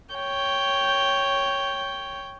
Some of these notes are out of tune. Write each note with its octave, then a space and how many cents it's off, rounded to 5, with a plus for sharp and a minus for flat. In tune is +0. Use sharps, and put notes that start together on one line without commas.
C#5 +0 G5 +0